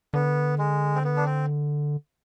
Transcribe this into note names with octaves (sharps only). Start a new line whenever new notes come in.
D3 B3
G#3
C4
B3
D4
C4